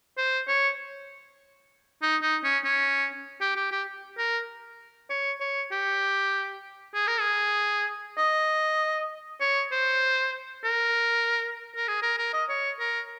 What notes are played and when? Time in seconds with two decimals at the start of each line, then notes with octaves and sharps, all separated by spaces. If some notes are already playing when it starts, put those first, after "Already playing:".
0.18 C5
0.48 C#5
2.02 D#4
2.22 D#4
2.44 C#4
2.64 C#4
3.41 G4
3.56 G4
3.72 G4
4.18 A#4
5.10 C#5
5.40 C#5
5.72 G4
6.94 G#4
7.07 A#4
7.20 G#4
8.18 D#5
9.41 C#5
9.72 C5
10.64 A#4
11.76 A#4
11.88 G#4
12.02 A#4
12.18 A#4
12.33 D#5
12.49 C#5
12.79 A#4